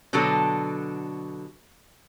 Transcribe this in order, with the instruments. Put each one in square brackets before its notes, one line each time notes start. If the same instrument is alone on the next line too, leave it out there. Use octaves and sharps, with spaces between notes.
[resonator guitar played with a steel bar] B2 D3 F#3 D4 F#4 A4